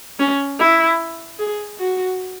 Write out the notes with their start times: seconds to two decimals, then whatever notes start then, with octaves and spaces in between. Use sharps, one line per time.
0.20 C#4
0.59 E4
1.39 G#4
1.78 F#4